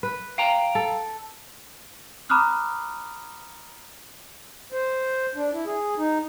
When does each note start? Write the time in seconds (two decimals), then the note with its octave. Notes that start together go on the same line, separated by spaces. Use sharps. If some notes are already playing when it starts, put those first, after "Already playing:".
0.03 B4
0.38 F5 G5 A#5
0.75 A4
2.30 A#5 B5 D6 D#6 F6 F#6
4.72 C5
5.36 D4
5.53 E4
5.66 G#4
5.98 D#4